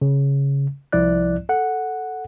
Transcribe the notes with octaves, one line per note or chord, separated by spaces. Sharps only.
C#3
C2 F3 E4 D5 F#6
A4 F#5